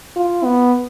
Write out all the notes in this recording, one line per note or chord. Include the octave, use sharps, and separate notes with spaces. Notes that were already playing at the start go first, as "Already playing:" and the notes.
F4
B3